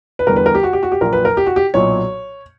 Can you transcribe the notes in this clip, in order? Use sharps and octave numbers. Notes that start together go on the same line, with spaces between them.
B4
E2 D3 G3 A#4
B4
A#4
G4
F#4
G4
F#4
G4
A#1 A#2 F#3 A#4
B4
A#4
G4
F#4
G4
B1 A#2 F#3 C#5